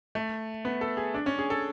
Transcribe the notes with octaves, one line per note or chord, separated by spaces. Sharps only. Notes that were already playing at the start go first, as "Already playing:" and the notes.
A3
B3
A4
G#4
D4
C#4
G#4
A4